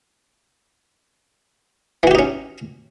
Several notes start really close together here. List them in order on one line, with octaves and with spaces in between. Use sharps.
E3 F#4 G4 D#4 C#4